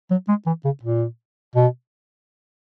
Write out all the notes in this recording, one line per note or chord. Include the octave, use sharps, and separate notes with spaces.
F#3
G#3
E3
C#3
A#2
B2